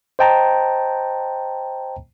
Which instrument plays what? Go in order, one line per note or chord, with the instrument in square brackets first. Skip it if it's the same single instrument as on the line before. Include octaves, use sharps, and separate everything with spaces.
[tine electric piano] C5 D#5 G5 A5 A#5